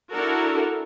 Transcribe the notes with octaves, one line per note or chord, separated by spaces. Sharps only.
D4 E4 F#4 A4 A#4